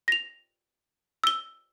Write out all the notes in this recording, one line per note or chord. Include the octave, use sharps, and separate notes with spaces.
A#6 F7
E6 G7